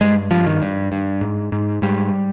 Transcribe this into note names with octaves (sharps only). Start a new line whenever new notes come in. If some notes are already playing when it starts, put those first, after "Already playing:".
G2 G#3
G2 F3
D#3
G2
G2
G#2
G#2
G#2 G3